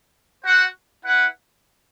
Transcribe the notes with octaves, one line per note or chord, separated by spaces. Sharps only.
F#4 C5 F#5
E4 B4 F#5